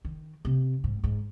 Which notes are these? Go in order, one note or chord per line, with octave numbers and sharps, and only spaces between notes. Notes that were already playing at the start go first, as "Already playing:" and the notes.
D#3
C3
G#2
G#2